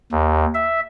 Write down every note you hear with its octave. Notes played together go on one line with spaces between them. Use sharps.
D#2
E5